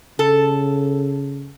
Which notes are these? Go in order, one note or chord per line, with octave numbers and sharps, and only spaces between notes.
C#3 A4